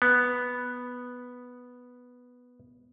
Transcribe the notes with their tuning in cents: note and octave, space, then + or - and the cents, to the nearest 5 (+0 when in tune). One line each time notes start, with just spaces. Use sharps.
B3 +0